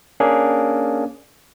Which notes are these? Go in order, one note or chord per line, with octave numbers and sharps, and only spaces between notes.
A#3 C#4 D4 G#4